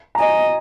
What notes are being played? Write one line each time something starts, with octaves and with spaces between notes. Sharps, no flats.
A#5
D#5 G#5